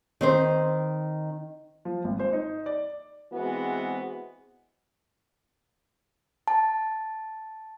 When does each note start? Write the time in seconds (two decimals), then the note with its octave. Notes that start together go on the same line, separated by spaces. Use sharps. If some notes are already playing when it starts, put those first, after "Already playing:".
0.21 D#3 C4 C5
1.85 F3
2.04 G#1
2.20 C5
2.33 D#4
2.66 D5
3.31 E3 G#3 B3 C4 F#4
6.48 A5